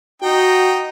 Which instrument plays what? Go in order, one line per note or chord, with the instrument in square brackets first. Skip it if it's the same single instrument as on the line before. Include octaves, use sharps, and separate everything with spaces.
[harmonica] D#4 G5 [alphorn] F#4